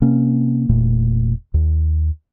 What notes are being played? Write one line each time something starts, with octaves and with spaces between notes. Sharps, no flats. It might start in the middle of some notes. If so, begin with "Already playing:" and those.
C3 A#3 C4 C#4
E1 A#2 A3
D#2